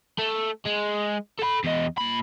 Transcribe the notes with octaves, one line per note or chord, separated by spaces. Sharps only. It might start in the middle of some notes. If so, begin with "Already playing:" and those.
A3
G#3
A4 B5
E2 D#5
A#2 B5